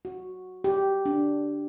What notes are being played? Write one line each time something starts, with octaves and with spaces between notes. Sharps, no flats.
F#4
G4
D4